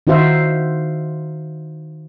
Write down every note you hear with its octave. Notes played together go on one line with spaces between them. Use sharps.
D#3 D#4 F#4 C5 E5 F5